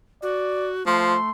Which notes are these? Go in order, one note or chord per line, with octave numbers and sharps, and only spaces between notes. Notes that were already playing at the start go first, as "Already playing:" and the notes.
F#4 D5
F3 A3 C6